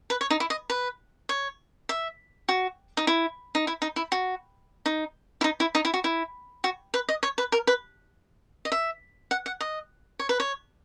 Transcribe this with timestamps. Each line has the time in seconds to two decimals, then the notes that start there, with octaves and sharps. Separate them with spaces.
0.10 B4
0.21 C#5
0.30 D#4
0.40 E4
0.50 D#5
0.70 B4
1.29 C#5
1.89 E5
2.49 F#4
2.97 D#4
3.07 E4
3.55 D#4
3.67 E4
3.82 D#4
3.96 E4
4.12 F#4
4.86 D#4
5.41 E4
5.44 D#4
5.60 E4
5.75 D#4
5.85 E4
5.94 F#4
6.04 E4
6.64 F#4
6.94 B4
7.09 D#5
7.23 C#5
7.38 B4
7.52 A#4
7.67 B4
8.65 D#5
8.72 E5
9.31 F#5
9.46 F#5
9.61 D#5
10.19 C#5
10.29 B4
10.40 C#5